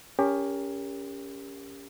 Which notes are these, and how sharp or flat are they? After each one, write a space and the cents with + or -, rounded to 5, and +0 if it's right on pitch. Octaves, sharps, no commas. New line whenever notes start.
C#4 +20 G4 +30 A#4 +0